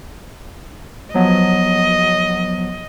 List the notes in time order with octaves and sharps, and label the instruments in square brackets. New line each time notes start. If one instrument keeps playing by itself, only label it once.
[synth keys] F3 F#3 B3 [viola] D#5